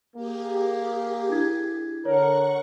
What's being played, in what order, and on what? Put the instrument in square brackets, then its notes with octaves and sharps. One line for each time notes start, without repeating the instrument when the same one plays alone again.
[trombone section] A#3 [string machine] G4 G#4
[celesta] D4 E4 G#6
[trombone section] D3 A#4 [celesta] C#5 [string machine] F#5 C#6